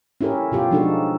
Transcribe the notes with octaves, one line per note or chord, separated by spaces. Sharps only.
C#4 E4 G4 A4 A#4
B2 F4 G4
F3 G#3 D4 D#4 F#4 A4